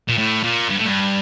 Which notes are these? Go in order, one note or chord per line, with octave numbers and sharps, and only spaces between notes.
A#2
A2
A#2
G2
A2
G2